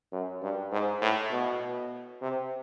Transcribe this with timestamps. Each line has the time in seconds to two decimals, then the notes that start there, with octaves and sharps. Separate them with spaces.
0.12 F#2
0.42 G2
0.72 G#2
1.01 A2
1.31 B2
2.22 C3